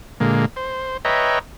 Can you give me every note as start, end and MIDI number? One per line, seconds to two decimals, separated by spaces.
0.20 0.45 46
0.20 0.45 50
0.20 0.45 56
0.20 0.45 58
0.56 0.97 72
1.05 1.39 71
1.05 1.39 73
1.05 1.39 75
1.05 1.39 76
1.05 1.39 79
1.05 1.39 82